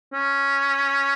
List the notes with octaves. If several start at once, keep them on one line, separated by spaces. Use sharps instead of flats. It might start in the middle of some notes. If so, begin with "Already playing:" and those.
C#4